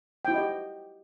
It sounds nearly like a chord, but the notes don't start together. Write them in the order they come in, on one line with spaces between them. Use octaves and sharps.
G5 E4 F#4 D#5 G4